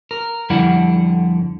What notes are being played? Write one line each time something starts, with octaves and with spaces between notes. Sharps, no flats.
A#4
F2 D3 G3 E4 D5 F#5